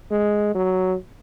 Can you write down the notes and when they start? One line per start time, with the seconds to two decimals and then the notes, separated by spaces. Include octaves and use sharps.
0.11 G#3
0.54 F#3